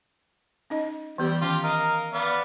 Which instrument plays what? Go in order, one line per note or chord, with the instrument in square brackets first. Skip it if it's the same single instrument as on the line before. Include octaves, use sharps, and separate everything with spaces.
[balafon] C#4 D#4 D#5
[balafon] E3 B3 G4 [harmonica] G3
[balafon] D#3 C#4 [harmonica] F4 G4
[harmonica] A#4 D#5 F5
B3 D5 F5